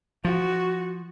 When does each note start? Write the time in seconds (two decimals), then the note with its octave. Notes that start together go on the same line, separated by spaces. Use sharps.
0.25 F3 F#4